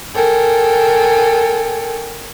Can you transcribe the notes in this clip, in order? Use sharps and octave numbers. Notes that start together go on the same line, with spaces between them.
A4 A#4 G5 G#5